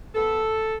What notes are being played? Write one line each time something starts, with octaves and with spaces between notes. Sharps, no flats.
B3 A4